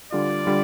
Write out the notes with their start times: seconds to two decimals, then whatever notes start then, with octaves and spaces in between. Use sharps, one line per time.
0.12 D3 G3 F4 D5
0.46 D3 G3 F4